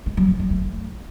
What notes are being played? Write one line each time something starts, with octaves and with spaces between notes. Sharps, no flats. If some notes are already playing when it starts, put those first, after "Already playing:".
G#3
F#3
F3
F#3
A3